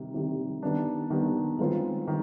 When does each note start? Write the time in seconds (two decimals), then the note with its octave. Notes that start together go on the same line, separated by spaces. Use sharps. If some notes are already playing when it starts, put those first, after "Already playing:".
Already playing: C3 D#3 G3
0.14 C3 D#3 G3
0.63 D#3 G3 B3 D4
1.10 D#3 G3 B3 D4
1.59 D#3 G#3 C4 F4 B4
2.08 D#3